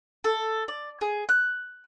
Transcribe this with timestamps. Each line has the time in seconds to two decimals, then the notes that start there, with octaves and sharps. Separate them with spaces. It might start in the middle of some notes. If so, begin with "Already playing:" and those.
0.24 A4
0.68 D5
1.01 G#4
1.29 F#6